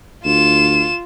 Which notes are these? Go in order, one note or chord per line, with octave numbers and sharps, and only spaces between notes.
D2 F4 E7